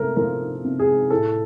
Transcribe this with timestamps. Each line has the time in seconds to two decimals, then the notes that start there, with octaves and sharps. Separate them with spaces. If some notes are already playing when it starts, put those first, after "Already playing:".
Already playing: C3 A3 A4 A#4
0.17 F3 A#4
0.64 C3
0.79 G#4
1.11 A2 A4